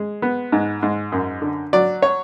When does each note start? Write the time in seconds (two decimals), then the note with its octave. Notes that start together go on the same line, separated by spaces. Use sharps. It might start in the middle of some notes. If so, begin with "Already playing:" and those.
Already playing: G#3
0.22 B3
0.52 G#2
0.83 G#2
1.12 F#2
1.42 D3
1.73 F#3 D5
2.02 C#5